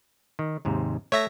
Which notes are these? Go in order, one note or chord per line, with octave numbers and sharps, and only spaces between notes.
D#3
D#2 G#2 C3
A3 C#5 E5 A#6